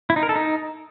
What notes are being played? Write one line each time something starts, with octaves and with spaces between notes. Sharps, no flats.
E4
D#4
A#4
A4
D#4